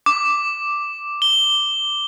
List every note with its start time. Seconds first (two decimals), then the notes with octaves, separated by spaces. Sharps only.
0.06 D6
1.22 G7